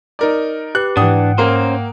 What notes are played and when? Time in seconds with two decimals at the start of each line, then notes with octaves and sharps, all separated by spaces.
0.19 D#4 A#4 D5
0.75 G4 B4 F#6
0.97 G#2 E3 D4 F#5 G5 D#6
1.38 A#3 C#4 A#4 C5